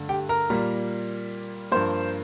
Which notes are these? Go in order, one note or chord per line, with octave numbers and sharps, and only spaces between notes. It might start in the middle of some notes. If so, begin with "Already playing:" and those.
Already playing: G2 D3 A3
G4 G5
A#4 A#5
A#2 G3 A#3
G2 F3 A#3 C5 C6